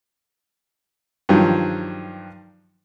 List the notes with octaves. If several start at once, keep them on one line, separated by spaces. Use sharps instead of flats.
G2 D#3 F3 F#3